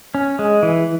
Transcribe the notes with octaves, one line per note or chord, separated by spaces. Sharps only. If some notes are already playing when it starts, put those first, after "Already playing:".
C#4
G#3
E3